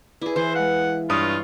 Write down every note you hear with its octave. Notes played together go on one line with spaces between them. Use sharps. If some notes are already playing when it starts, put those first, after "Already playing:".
E4 G#4 B4 D5
E3 C5 E5
G#3 F5 F#5
G2 F4 C#5 D#6